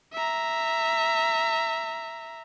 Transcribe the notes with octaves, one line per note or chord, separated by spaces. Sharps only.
E5 A#5